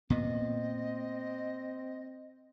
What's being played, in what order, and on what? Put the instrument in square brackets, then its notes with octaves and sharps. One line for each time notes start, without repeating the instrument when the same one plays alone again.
[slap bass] A#2 B3 [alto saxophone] C4 [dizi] D#5